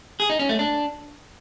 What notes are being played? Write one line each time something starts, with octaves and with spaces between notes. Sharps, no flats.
G#4
D#4
C#4
A3
D4